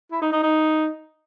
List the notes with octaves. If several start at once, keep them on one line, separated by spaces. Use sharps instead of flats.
E4
D#4
D#4
D#4